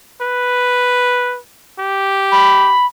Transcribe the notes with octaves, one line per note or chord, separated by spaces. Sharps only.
B4
G4
B5